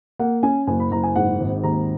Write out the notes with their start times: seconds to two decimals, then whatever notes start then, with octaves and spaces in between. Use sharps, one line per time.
0.19 A#3 F#5
0.43 C#4 G#5
0.67 F#1 G#5
0.80 B5
0.91 F#1 A#5
1.03 G#5
1.16 G#2 F#5
1.40 G#1
1.64 D#2 A#5